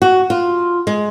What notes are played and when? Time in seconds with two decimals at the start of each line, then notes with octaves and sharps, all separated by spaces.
0.02 F#4
0.30 F4
0.87 G#3